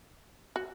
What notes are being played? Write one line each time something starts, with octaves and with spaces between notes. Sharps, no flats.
F#4